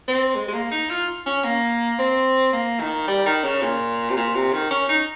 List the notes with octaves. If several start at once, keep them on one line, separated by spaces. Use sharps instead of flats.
C4
G#3
G#3
A#3
D#4
F4
C#4
A#3
C4
A#3
D#3
G3
D#3
C#3
A#2
C3
A#2
C3
D#3
C#4
D#4